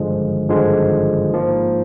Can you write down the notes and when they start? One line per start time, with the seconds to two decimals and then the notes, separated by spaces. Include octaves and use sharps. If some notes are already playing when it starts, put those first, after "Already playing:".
Already playing: G#1 G2 D3 F3 G#3
0.49 G#1 G2 D3 F3 G#3
1.32 G#2 F3 A#3